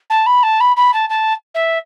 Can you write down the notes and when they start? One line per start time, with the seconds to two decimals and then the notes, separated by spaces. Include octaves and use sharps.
0.10 A5
0.26 B5
0.43 A5
0.60 B5
0.77 B5
0.94 A5
1.10 A5
1.55 E5